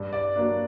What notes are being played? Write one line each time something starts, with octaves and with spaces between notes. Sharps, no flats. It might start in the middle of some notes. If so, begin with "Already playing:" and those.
Already playing: G2
D5
F#3 A#3 D4